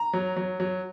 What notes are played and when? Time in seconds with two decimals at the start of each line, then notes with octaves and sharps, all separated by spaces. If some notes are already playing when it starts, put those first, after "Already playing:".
Already playing: A#5
0.13 F#3
0.36 F#3
0.60 F#3